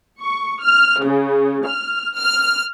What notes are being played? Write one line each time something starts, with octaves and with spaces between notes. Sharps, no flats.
C#6
F6
C#3
F6
F6